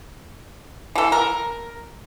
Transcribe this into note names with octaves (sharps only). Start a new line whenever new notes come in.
E3 A4
A#4